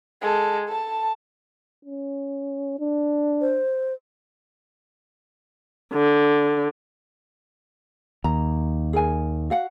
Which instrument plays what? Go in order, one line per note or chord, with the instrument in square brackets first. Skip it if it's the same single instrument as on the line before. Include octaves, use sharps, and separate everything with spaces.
[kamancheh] G#3 A4
A4 A5
[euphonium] C#4
D4
[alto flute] C5
[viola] D3
[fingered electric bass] D#2 [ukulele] A#5
[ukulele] G#4 A#4 G#5
F#4 F5 F#5